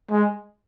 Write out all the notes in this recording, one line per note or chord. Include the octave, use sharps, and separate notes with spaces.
G#3